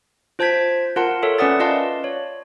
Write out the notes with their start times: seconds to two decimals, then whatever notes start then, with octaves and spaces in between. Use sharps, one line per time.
0.39 F4 C5 A5 G6 G#6 B6
0.96 F4 A#4 F#5 A5 C6
1.22 A4 A#4 C#5 E5
1.38 C#4 B4 D5 F#5 D#6 A6
1.60 F4 D5 D#5 F5 A5 C6
2.04 C#5